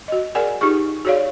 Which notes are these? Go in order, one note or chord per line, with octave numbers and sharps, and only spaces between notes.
F#4 D#5
G#4 A#4 D5 F#5 G#5
D#4 F4 G4 G#4 C#6
F#4 G#4 C#5 D5 F5